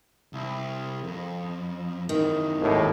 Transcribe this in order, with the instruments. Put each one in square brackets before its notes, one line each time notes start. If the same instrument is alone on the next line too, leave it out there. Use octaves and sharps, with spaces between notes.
[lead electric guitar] C2
F2
[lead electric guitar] F#2 E3 [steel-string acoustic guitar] D#3
[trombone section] G#1 D#2 A2